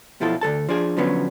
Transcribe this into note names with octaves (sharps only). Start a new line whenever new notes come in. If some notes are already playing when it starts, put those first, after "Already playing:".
B1 B2 F3 E4 F4 A4
D2 C#3 A4 A5
F3 D4 G#4
D3 F3 F#3 B3 C#4